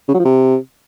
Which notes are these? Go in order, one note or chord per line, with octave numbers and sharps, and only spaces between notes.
C#3
F#3
F3
C3